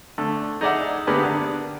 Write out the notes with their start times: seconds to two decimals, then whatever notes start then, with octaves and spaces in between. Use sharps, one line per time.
0.18 D3 A3
0.61 D#4 G#4 D5 E5 F#5
1.07 D3 A#3 B3 G4 G#4 D5
1.23 D3